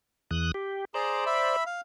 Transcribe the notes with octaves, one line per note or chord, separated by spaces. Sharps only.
E2 D#6 F#6
G4
G#4 C5 D5 A#5
E5 B5
F5